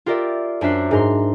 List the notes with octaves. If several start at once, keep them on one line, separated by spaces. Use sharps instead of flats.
F4 G4 A#4 D5 E5
F#2 D4 C5 E5 F#6 C7
G#2 A#4 C6